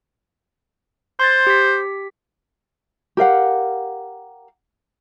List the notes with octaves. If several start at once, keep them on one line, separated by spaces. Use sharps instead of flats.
C5 C6 G#6 A6
G4 B6
G4 A#4 F5 F#5